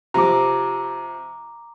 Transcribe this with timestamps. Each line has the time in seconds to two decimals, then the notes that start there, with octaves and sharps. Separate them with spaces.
0.14 C3 F3 A#5 D6